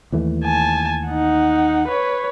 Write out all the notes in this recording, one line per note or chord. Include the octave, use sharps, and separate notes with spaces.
D#2 E3 A3
G#5 A5
D#4 F#5
B4 C#5